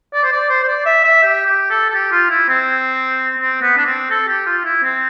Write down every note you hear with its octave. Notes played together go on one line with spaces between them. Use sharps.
D5
C5
D5
C5
C5
D5
E5
E5
G4
G4
A4
A4
G4
F4
E4
C4
C4
B3
D4
C4
A4
G4
F4
E4
C4